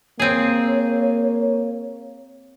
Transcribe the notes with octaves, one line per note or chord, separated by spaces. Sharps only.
A#3 C4 G#4 C#5